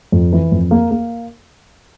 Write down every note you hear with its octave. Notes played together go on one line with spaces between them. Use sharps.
F2
E3
F2
A#3
A#3